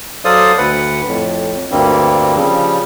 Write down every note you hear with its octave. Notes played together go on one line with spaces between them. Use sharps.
F#3 A4 C5 D5 F5 D#6
D2 B4 F#5
F2 A2
D2 G2 G3 A#3 C4
C#3 F3 G3